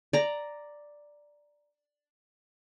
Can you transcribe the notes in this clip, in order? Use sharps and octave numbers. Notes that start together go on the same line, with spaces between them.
D5 A#5